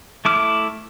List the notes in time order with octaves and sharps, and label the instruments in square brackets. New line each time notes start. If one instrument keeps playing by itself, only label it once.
[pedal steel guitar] A3 E4 D6 F6